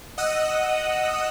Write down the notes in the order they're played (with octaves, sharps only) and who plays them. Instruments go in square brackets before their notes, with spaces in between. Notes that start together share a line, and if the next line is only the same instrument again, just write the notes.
[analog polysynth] D#5 F#5 D#6 E6 F#6